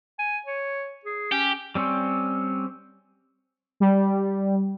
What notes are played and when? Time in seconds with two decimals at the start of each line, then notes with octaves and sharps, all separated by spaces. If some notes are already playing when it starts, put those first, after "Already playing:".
0.19 G#5
0.46 C#5
1.05 G#4
1.32 C#4 G4
1.75 G3 C4 C#4
3.80 G3